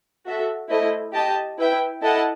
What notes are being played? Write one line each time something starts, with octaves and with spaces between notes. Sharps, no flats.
F#4 A4 E5
A3 E4 A4 C5 D#5
G4 D#5 A5
E4 B4 E5 G5
E4 A4 D#5 F#5 A5